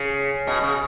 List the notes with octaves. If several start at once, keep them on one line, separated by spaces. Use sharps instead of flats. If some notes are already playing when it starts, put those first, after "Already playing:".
Already playing: C#3
B2
C#3